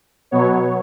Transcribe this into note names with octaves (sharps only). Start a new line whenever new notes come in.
B2 F#3 B3 C#5